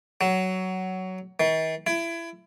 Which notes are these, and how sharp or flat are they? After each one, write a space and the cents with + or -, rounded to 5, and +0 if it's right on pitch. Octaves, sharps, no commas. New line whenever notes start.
F#3 +15
D#3 +45
E4 +25